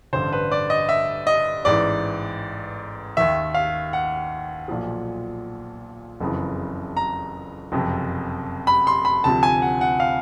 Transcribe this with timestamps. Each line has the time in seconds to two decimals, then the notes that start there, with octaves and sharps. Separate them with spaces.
0.13 A1 G2 D3 C5
0.32 B4
0.52 D5
0.70 D#5
0.89 E5
1.27 D#5
1.65 A1 G#2 E3 D5
3.17 D#2 D#3 E5
3.55 F5
3.93 F#5
4.68 B1 A#2 F3
6.20 F#1 F2 C#3 E3
6.97 A#5
7.72 F#1 F2 C3
8.67 B5
8.87 C6
9.05 B5
9.24 D2 C3 F3 A5
9.43 G#5
9.62 F#5
9.81 F#5
10.00 F5